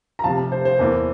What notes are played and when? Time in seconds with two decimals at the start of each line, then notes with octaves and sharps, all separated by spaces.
0.19 A#5
0.23 F1 F2 C3 F5 A5
0.52 C5
0.65 C5
0.79 E2 E3 A#3